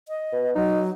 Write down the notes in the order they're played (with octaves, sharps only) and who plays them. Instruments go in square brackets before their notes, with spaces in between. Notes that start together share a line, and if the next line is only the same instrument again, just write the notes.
[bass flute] D#5
[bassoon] B2
[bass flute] F#3 [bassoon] D#4